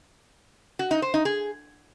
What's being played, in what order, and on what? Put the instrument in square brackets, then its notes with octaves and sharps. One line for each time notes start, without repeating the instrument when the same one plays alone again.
[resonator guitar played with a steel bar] F#4
D#4
C5
D#4
G#4